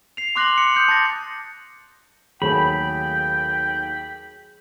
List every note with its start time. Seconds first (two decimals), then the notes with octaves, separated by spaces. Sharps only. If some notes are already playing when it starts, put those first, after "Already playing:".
0.17 C7 F7
0.36 C6 D6 F#6 A#6 C7 F#7
0.54 C6 C#7
0.75 D#6 G6 C#7
0.88 A5 D6 A6 A#6
2.42 D#2 F#3 A3 G#4 G5 B5